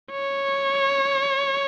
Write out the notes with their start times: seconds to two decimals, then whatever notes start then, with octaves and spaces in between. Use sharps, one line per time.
0.11 C#5